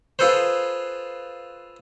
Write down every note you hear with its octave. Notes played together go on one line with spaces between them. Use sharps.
F4 G#4 A4 B4 C5